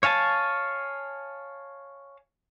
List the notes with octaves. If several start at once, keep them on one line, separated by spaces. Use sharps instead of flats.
C#5 F5 G#5 A5